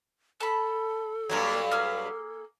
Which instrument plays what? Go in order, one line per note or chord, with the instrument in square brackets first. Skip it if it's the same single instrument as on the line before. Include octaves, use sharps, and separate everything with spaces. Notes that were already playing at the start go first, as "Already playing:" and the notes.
[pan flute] A4 [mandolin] A5 B5
[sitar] G2 F#3 [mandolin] A#3 D4 G#4
[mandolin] A#3 G#4 F6